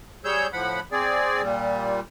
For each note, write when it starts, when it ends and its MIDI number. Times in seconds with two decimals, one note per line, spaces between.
0.25 0.47 55
0.25 0.47 68
0.25 0.47 73
0.25 0.47 88
0.25 0.47 91
0.53 0.80 45
0.53 0.80 53
0.53 0.80 78
0.53 0.80 83
0.92 1.42 60
0.92 1.42 68
0.92 1.42 74
1.42 2.00 46
1.42 2.00 55